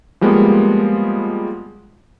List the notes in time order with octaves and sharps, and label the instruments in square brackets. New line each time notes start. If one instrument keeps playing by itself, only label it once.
[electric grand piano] F3 G3 G#3 A#3 B3